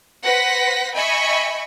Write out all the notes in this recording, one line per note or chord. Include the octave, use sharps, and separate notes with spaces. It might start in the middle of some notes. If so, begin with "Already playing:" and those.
B4 C5 F#5 A#6 B6
D#5 E5 G5 G#5 B5 C#6